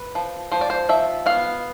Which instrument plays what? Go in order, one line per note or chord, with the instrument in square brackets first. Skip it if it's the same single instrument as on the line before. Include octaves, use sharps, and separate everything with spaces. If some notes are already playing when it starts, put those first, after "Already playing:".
Already playing: [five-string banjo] B4
F3
F3 C5
D5
C5
F3 E5
B3 F5